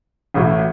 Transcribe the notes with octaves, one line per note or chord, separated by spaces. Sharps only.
A1 A2 A3 F#4